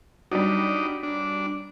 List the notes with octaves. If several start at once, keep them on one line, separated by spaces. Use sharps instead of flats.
F#3 G3 D4 D#4
D4